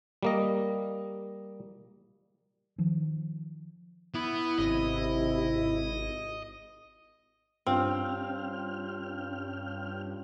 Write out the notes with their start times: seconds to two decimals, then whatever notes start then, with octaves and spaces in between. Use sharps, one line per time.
0.23 G3 A#3 D#5
2.78 D#3 F3
4.14 B3 E4
4.58 G#1 C3 D#5
7.67 G2 C4 C#4 F4 G5 F6